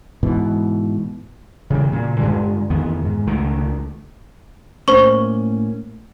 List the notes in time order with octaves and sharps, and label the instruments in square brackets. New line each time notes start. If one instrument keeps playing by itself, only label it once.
[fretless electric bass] G#2 B2 E3
[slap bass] C#3 E3 G3
A#2 C#3
G2 D3 G3 G#3
F2 D#3 E3 B3
G#2
C#2 D3 D#3 A3
[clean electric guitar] A2 A#3 C#4 [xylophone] C5 C#6